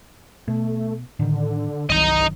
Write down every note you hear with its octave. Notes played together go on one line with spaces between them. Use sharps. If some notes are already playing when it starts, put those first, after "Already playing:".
B2 A3
A2 D3 D#3
G1 C2 D#3 F#3 D#5 A#5